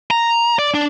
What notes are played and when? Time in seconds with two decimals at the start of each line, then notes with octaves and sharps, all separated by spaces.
0.11 A#5
0.59 D5
0.74 D4